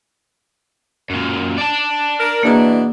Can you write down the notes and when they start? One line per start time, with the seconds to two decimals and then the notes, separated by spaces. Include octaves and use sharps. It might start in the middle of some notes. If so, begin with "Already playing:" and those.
1.10 F#2 A#2
1.58 D5 A5
2.20 A#4
2.43 B2 E3 A#3 D4 G#4 A#5